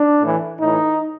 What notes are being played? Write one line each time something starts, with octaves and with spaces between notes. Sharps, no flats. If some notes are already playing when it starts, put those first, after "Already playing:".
Already playing: D4
A2 E3
A2 E3 D#4